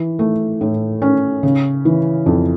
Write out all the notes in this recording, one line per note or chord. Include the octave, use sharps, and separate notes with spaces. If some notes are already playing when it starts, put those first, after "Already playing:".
Already playing: E3
A3
A2
C#4
C#3
E3
F2